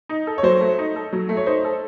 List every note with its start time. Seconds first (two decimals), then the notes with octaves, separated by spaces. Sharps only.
0.09 D#4
0.27 A4
0.38 C#5
0.43 F#3 C5
0.61 A3
0.78 D#4
0.96 A4
1.13 F#3
1.29 A3
1.37 C#5
1.46 D#4 C5
1.64 A4